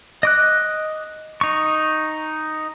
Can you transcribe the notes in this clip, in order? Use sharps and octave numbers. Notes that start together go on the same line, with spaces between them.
D#5 D6 F#6
D#4 C#6